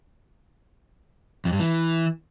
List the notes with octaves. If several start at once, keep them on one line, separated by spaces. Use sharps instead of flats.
F2
G2
E3